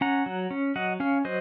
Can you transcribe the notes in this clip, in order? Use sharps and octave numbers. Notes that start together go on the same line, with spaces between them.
C#4 F#5 A#5
F#3
C#4
F#3 D#5 F#5
C#4 C#5 F5
F#3 C5 D#5